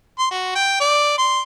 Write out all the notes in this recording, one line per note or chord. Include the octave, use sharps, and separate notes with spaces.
C6
F#4
G5
D5
C6